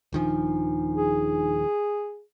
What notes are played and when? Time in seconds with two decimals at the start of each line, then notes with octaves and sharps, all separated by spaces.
0.13 D#1 D#3 F3 D4 D#4 G#5
0.95 G#4